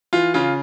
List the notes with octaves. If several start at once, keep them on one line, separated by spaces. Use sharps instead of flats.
E3 F4
C#3 F4